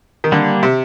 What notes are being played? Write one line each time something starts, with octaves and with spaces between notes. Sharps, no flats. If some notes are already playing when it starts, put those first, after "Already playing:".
D#3
D3 G3 A#3 D4
C3